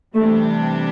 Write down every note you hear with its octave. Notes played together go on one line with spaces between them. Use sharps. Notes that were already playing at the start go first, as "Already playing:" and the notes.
C3 E3 G3 A3 D4 G4